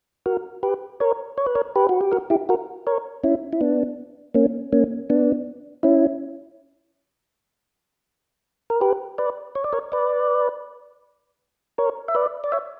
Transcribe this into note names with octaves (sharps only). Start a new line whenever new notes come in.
F#4 A#4
G4 B4
A#4 C#5
C#5
B4
A#4 C#5
G4 B4
F#4
G4
F#4 A#4
E4 G4
F#4 A#4
A#4 C#5
C#4 E4
E4
B3 D4
A#3 C#4
A#3 C#4
B3 D4
C#4 E4
A#4
G4 B4
B4 D5
C#5
D5
A#4 C#5
B4 D5
A#4 C#5
E5
B4 D5
D5
C#5 E5